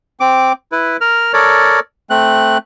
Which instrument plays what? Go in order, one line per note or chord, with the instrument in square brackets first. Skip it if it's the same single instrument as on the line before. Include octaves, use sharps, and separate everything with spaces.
[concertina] C4 D6
E4 B4
A#4 F6
A4 A#4 C#5 D5
A3 C4 F#6